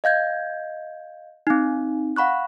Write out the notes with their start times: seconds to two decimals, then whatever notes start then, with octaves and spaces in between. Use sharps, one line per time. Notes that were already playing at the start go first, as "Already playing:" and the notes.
0.04 D#5 F5 G6 G#6
1.47 C4 D#4
2.16 F5 F#5 B5 C#6 F#6